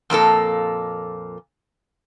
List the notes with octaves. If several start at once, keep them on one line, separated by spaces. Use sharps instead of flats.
F2 A#2 A#3 A4